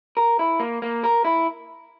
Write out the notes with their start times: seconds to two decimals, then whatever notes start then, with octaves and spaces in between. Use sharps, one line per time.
0.17 A#4
0.39 E4
0.60 A#3
0.82 A#3
1.03 A#4
1.25 E4